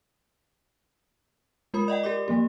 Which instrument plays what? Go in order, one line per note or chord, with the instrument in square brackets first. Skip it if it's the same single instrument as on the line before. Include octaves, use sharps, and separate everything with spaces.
[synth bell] G#3 F4 A#4 B5 D#6
D5 D#5 F#5 G5
G4 A#4 D5 D6
F3 A#3 G4